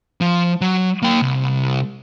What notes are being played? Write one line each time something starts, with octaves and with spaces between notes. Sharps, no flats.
F3
F#3
A#3 G5
C2